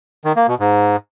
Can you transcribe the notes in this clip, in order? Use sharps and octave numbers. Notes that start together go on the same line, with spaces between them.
D#3
A#3
B2
G#2